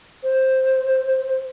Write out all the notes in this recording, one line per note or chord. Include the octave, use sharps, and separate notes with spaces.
C5